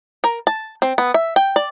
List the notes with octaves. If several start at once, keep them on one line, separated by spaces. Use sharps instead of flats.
A#4
A5
C4
B3
E5
G5
D5